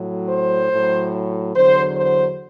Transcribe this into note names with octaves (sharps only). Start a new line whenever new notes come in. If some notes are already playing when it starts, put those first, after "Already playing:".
Already playing: A2 F#3
C5
A2 F#3
E2 D3 F#3 C5
C5